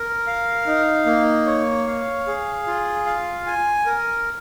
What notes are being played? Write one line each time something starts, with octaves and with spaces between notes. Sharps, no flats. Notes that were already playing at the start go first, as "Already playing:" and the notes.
Already playing: A#4
F5
D#4
A#3
C#5
F5
G#4
F4
F5
G#5
A#4